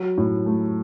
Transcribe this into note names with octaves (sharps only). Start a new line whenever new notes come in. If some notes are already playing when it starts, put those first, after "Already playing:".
Already playing: F#3
A2
A3